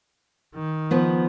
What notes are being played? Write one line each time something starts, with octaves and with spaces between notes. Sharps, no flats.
D#3
F3 B3